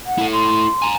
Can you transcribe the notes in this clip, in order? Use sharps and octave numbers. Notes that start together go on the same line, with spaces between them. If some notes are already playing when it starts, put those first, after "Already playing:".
F#5
E4 A4
C6
G#5 A#5